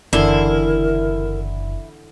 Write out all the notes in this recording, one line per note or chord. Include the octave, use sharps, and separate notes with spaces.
F#1 D3 E3 E4 A#4 C6